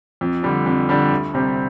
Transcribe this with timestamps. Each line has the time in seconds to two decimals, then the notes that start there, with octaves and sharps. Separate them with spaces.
0.21 F2
0.43 D3 G3 D4
0.66 F2
0.89 D3 G3 D4
1.11 D2
1.34 C3 G3 C4